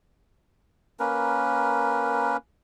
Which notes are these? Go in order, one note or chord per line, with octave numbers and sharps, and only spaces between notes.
A#3 C#4 A#4 B4